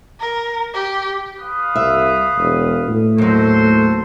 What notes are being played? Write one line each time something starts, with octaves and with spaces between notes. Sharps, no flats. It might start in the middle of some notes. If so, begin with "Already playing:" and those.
A#4
G4
B4 F5 D#6
C2 E5
E1
A2
D#2 F#3 F#4 A4 C5